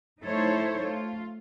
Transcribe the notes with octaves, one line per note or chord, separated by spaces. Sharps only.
A3 D#4 E4 A4 C5 C#5
A3 F4